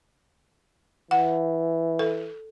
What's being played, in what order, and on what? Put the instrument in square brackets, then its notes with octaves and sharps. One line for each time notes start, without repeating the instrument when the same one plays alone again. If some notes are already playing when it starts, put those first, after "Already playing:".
[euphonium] E3 [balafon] F#5
[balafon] A4